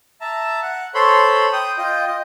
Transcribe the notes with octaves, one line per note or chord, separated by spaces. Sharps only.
E5 A5 A#5
F#5
A4 C5 C#5 B5 C6
G5 D#6
F4 D#5 G5
D#5